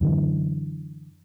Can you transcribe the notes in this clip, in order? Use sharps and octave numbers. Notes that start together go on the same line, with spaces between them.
F#2 D3 E3